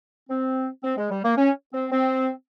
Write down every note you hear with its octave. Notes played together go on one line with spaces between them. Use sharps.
C4
C4
G#3
G3
A#3
C#4
C4
C4